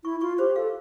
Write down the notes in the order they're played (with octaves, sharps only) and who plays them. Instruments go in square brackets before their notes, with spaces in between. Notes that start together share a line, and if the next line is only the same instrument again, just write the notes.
[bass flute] E4 [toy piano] C#6
[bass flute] F4 [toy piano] C#6
[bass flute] G4 [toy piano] C5
[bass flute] A4 [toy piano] F5